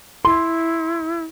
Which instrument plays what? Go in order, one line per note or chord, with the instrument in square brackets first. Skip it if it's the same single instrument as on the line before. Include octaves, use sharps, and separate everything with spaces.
[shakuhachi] E4 [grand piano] C6